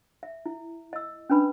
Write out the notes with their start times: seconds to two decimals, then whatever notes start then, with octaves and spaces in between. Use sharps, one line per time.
0.23 E5
0.46 E4
0.93 D#5 E6
1.30 C#4 D4 B4 B5